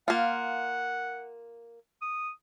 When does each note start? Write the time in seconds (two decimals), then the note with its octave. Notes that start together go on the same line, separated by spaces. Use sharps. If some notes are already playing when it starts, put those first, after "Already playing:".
0.08 A#3 F4 F#5
2.01 D#6